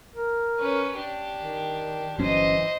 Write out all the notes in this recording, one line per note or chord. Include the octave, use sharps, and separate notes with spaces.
A#4
C#4 B4
D4 G4
D#3
G1 E3 F#3 C#4 C5 D#5